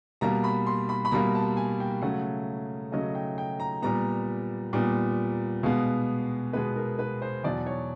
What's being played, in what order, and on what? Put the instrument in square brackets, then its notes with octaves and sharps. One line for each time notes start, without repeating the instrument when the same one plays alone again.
[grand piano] B2 G3 A#3 A#5
B5
C6
B5
B5
B2 G3 A#3 A#5
A5
G#5
G5
C#3 F#3 A3 F#5
C#3 F#3 A3 D#5
G5
G5
A#5
A#2 G3 B3 A#5
A#2 G3 B3
B2 G#3 B3 F5
B2 G#3 B3 B4
A#4
B4
C5
E2 B2 F#3 D5
C#5